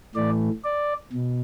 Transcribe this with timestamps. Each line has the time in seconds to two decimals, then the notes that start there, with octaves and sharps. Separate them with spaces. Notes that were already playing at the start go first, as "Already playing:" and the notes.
0.15 A2 E3 A3 D5
0.64 D5
1.13 B2